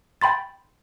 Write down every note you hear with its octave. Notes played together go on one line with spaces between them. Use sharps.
G5 B5 C6 A6